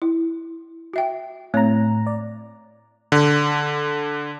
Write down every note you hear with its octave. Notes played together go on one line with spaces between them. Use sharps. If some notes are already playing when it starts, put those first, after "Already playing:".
E4
F#4 E5 G5
A2 A3 C4 C#5 A#5
D5
D3